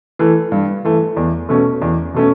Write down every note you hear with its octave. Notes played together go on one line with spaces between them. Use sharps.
E3 A3
G2
E3 A3
E2
B2 A3 C#4
E2
B2 A3 C#4